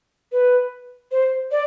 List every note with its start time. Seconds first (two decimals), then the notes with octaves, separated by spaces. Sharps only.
0.32 B4
1.12 C5
1.51 D5